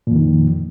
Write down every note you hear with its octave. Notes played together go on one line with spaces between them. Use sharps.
F2 A#2 D#3